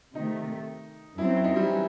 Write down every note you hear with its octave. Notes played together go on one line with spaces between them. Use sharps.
C3 D#3 A3 D#4
F#2 F#3 C4 E4
E4
D#4
G3
F#3
E3